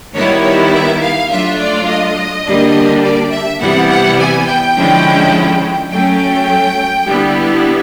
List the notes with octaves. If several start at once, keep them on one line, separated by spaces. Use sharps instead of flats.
D#3 G3 B3 E4 C#5
C#5
E5
F5
F#3 A3 D4 F4 E5
D5
D#5
D3 G3 A#3 D4
D5
E5
C3 E3 G3 B3 E4 F#5
F#5
G#5
G5
D3 F3 G#3 C#4 E4
F#3 A3 C#4 G5
D3 G3 B3 E4